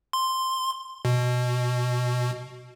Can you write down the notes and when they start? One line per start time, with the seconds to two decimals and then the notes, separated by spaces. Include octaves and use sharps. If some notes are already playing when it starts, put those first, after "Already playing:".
0.13 C6
1.05 B2